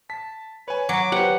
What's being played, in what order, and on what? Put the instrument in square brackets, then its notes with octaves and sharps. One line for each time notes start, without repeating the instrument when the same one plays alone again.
[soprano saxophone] A5 [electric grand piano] B6
[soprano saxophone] B4 [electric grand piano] C#5 G#5
[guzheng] F#3 [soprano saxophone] D6
[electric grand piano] G4 B4 [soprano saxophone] C5 [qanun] F#5